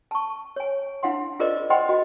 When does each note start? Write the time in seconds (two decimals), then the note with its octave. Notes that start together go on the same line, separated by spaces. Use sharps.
0.11 A5 C#6
0.56 C#5 G#5
1.03 D4 E4 F5 F#5 C6
1.40 F4 G#4 A#4 C5 D5 D#5
1.70 C5 D#5 F#5 G5 B5 C6
1.89 F#4 D#5